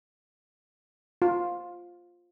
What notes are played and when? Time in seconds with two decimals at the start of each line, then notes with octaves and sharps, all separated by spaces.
1.22 F4